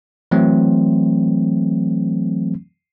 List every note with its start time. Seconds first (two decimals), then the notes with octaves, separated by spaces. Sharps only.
0.31 E3 F#3 A3 C4